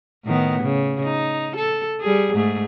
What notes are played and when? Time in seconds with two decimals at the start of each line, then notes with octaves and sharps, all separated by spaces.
0.25 A2 D#3 B3
0.62 C#3
1.04 D#4
1.56 A4
2.01 G3 G#4
2.34 G#2 A3 G#4